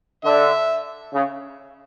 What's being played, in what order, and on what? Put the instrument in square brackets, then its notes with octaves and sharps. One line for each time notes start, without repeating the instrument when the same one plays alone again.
[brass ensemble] D3 [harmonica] E5
[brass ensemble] C#3